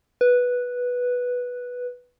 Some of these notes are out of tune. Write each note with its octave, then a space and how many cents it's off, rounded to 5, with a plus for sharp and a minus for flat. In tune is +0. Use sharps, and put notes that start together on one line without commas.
B4 -5